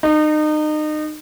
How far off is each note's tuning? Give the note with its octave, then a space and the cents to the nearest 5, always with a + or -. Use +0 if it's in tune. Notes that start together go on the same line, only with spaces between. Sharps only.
D#4 -30